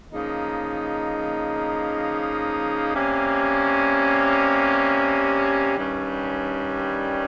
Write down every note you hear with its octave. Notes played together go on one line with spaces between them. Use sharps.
C#3 F3 A#3 D#4
C3 G3 A#3 C#4
G2 D#3 G3 C#4